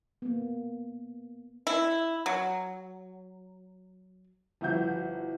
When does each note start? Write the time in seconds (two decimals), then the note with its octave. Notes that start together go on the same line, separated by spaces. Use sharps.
0.22 A#3 B3
1.67 E4
2.26 F#3
4.61 G1 F3 E4 F#4 G6